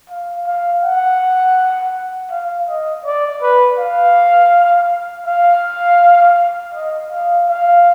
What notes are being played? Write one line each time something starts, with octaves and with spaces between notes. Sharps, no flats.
F5
F5
F#5
F5
D#5
D5
B4
F5
F5
D#5
F5
F5